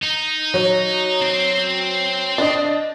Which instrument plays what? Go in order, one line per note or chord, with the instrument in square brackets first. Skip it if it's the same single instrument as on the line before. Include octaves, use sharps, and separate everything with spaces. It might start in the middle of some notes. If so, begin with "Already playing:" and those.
[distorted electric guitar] D#4
[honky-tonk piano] F#3
[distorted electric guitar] C4 C5
[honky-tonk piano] D4 D#5